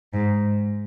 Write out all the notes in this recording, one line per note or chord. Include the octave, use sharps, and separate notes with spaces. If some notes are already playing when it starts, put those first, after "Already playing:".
G#2